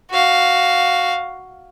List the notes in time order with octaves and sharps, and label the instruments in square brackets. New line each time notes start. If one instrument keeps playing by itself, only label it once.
[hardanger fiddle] F#4 F5